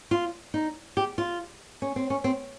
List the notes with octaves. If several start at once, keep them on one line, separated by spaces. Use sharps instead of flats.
F4
D#4
G4
F4
C#4
C4
C#4
C4